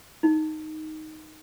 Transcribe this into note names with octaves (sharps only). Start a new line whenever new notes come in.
D#4